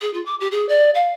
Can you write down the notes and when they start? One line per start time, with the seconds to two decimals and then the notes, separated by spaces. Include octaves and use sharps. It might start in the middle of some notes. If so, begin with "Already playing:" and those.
0.01 G#4
0.13 F4
0.25 D6
0.40 G4
0.51 G#4
0.68 D5
0.94 F5